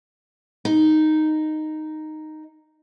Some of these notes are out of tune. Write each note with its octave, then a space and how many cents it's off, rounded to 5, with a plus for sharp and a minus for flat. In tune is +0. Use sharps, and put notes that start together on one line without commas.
D#4 -5